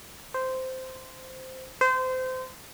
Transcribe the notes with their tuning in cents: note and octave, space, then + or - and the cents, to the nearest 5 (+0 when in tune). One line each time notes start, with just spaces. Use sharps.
C5 -10
C5 -25